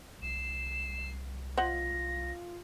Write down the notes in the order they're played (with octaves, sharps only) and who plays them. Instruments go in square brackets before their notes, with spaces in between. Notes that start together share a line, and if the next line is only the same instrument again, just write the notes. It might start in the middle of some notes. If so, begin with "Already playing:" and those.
[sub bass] C2 [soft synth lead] C7 [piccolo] E7
[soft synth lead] F4 [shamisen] C5 D#5 F#5 [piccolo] A#6